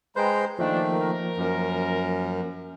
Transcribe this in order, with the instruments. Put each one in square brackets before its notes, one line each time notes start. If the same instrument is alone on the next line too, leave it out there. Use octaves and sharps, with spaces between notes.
[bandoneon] G#3 C5 [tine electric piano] B4 G5 [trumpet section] A#5
[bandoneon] D#3 A3 [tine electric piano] F3 A#3 [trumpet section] D4
[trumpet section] A#4
[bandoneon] F#2